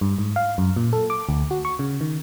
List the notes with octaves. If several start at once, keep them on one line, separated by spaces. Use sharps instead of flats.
G2
G#2
F5
F#2
A#2
A4
D6
D2
F#4
C#6
C#3
D#3